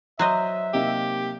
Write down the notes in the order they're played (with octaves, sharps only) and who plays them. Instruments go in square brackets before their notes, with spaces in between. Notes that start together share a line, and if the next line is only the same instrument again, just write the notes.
[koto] F#3 C5 D#5 [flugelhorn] E5
[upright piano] C3 A#3 D#4 [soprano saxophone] G4